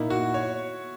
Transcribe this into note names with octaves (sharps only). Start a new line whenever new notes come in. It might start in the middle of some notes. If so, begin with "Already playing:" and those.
Already playing: A#2 A#3 D#4 E4
F#4
C#5